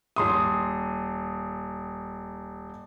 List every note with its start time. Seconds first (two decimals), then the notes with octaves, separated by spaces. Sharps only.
0.16 D#1 C6 D#6